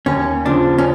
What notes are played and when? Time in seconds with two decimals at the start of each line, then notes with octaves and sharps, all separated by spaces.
0.06 D#2 C#4
0.45 C#3 F3 D4
0.78 C#4